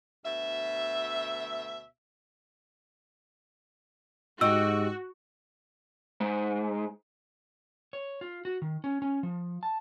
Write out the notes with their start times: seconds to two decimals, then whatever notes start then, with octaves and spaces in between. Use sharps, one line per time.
0.25 D2 B2 E5
4.41 G#2 F#4 G4 D#5 F#5 E6
6.21 G#2
7.93 C#5
8.21 F4
8.45 F#4
8.62 D#3
8.84 C#4
9.02 C#4
9.23 F3
9.63 A5